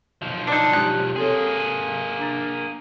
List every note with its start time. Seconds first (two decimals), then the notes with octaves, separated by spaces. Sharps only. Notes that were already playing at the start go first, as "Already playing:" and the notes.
0.22 B1 F3
0.47 D4 D#4
0.73 G#3 G4 F#6
1.16 A#3 C4 G#4 A4 C#5
2.19 D4 A#5 A6